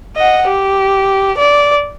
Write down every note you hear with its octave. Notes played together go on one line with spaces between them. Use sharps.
D#5 F#5
G4
D5